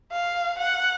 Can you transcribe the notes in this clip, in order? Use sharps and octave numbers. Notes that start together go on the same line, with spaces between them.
F5
F#5